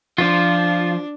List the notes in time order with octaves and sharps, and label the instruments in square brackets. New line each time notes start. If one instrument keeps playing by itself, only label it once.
[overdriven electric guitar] F3 [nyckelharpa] D4 [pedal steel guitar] F4